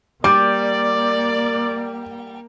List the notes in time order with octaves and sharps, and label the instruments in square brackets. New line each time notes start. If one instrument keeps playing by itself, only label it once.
[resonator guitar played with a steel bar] G3 [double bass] A#3 [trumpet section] D5 [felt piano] D6